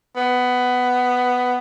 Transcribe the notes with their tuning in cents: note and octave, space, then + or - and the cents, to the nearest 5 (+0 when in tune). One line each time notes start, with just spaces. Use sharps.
B3 +10